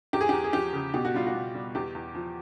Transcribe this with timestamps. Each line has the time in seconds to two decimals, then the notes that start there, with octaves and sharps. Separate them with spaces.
0.13 E2 G4
0.21 G#4
0.29 E2 G4
0.44 G#4
0.53 F3 G4
0.73 C#3
0.94 B2 G4
1.05 F#4
1.14 G3 F4
1.27 F#4
1.35 B2
1.55 G3
1.75 E2 G4
1.95 E2
2.15 F3